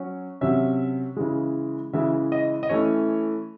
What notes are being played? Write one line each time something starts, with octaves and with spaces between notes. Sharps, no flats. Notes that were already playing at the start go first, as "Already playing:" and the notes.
Already playing: F#3 C#4
C3 F#3 C#4 E5
C#3 E3 G#3
C#3 E3 G#3 E5
D#5
D#5
E3 A3 C#4 C#5